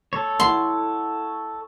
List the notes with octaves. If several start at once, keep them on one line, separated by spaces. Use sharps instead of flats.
A4 C#5
E4 F#5 C6